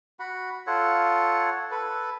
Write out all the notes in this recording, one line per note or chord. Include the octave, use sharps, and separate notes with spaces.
F#4 F#5 B5
F4 A4 C#5 F#5
A4 B4